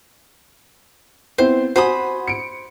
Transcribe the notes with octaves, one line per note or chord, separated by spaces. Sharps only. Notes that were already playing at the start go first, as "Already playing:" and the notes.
B3 C4 E4 C5
F#4 C5 G#5 B5 D#6
C#7 D7